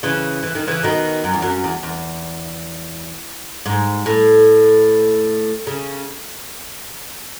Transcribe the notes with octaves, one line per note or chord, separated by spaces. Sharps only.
C#3 E3
E3
D#3
C#3 E3
B2 D#3
F#2
E2
F#2
E2
E2
G#2
A2
C#3